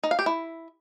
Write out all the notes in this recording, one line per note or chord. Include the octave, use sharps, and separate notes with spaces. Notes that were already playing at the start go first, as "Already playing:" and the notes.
D#4
F5
G4
E4